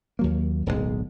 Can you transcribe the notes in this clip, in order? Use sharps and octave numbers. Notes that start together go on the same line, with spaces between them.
D#2 F#3 A#3
D1 B1 A2 G#3